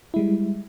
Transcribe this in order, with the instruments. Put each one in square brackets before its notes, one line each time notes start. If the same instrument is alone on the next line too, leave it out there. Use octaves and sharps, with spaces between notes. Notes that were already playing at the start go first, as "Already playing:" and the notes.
[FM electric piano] E4
G#3
G3